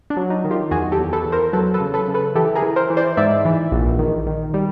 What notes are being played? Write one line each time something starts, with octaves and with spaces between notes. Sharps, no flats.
D4
F#3
D#4
D#3
F4 G4
E2 F#4 G#4
G4 A4
E2
A4 B4
E2
A#4 C5
F#3 A4 B4
A4 B4
C#3
A4 B4
C#3
A4 B4
E3 G4 A4
G#4 A#4
E3
A#4 C5
E3
C5 D5
G#2 D5 E5
E3
A#1
D#3
D#3
G3